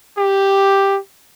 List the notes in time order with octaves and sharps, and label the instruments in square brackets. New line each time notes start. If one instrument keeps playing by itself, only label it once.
[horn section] G4